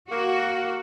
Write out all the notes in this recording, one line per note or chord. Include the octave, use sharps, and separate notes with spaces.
A#3 F#4